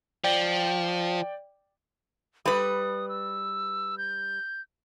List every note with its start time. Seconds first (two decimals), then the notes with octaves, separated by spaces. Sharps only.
0.24 F3 D5 G5
2.46 G3 B4 D#6
3.09 E6
3.98 G6